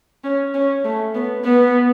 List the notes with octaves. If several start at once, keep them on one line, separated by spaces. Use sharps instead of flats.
C#4
C#4
A3
B3
B3